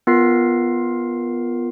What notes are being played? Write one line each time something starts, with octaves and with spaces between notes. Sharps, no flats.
B3 F4 A#4 C7